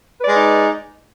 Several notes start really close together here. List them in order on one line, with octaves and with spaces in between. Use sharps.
B4 D5 G#3 D#4